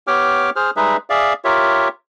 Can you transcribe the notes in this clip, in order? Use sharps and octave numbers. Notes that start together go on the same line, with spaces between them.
B3 G4 C#5 G5 D6 F6
G#4 C5 F6
G3 G#3 D#4 G#4 B4 E5
G#4 D5 E5 F5
F4 G4 A#4 C#5 E5